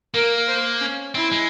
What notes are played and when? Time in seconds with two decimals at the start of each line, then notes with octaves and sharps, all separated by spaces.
0.14 A#3 A#4
0.48 C5
0.81 C#4
1.15 C4 E4
1.32 G#3